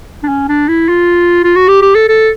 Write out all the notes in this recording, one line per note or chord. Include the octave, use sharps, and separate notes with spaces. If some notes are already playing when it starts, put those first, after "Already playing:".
D4
C#4
D4
E4
F4
F4
F#4
G4
G4
A4
A4